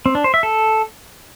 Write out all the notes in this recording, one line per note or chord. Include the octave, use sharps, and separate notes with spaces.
C4
D4
C5
E5
A4